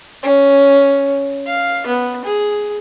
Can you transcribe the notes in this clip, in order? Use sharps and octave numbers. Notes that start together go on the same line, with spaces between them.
C#4
F5
B3
G#4